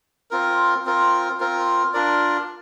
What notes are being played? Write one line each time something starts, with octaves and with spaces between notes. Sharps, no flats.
C4 F4 A#4
C4 F4 A#4
C4 F4 A#4
D4 F4 A#4 D5